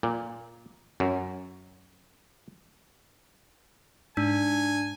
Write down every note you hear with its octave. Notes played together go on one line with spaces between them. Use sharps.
A#2
F#2
G#2 D4 G#5